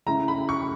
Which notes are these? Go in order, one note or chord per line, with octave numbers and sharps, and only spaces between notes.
C#3 G#3 C#4 E4 A#5
B5
C#6